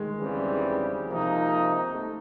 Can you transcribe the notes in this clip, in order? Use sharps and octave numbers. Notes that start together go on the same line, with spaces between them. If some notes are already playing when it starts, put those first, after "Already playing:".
Already playing: D#3 G#3
E2 C#3 E3 G3 C4
C3 F3 A#3 D#4
A3